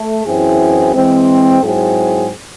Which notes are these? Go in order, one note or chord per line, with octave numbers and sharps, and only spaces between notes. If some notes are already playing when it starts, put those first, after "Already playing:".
Already playing: A3
F#2 E3 C4 E4 G#4
E3 G#3 C4
G#2 F#3 C4 E4 G#4